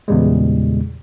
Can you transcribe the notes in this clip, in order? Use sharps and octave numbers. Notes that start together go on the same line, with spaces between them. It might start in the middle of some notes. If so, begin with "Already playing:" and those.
E2 A#2 C#3 G3 G#3